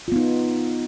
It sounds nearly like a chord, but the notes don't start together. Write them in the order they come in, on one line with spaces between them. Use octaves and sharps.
F4 B3 D#4